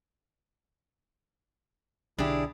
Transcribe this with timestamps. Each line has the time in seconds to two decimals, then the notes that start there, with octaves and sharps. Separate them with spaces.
2.18 B1 D3 D4 E4 G4 G#4